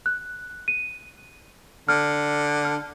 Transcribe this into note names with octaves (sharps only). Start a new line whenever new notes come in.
F#6
D#7
D3 F6
F6